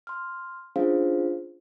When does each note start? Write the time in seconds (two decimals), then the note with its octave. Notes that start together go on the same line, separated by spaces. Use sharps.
0.07 C6 F6
0.76 C#4 D4 F4 G#4 C5 F5